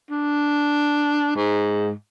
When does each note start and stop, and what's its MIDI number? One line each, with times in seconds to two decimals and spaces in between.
0.10 1.33 62
1.36 1.91 44